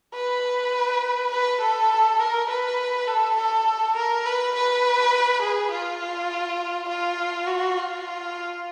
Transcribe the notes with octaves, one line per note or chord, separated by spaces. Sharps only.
B4
B4
A4
A#4
B4
A4
A4
A#4
B4
B4
G#4
F4
F4
F#4
F4